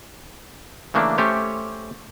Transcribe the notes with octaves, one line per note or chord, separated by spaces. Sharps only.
C#3 E3 A3 A#3 D4
A3 C#4 G4 C5 C#5